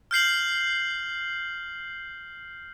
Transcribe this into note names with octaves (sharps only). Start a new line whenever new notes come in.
F6 G6 C7 F#7